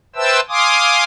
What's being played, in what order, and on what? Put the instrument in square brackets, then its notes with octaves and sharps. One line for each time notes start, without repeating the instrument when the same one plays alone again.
[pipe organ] B4 C5 E5 G5 A5 E6
F5 G#5 C6 D6 D#6